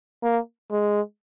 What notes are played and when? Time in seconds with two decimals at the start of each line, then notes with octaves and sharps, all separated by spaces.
0.23 A#3
0.71 G#3